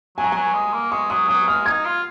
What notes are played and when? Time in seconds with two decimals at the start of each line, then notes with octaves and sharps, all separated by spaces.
0.17 F#3 G#5
0.24 A#5
0.32 F#3 G#5
0.54 G#3
0.73 A#3
0.92 G#3 C#6
1.10 F#3 D#6
1.28 F#3 D#6
1.47 G#3 F6
1.66 D#4 G#6
1.85 F4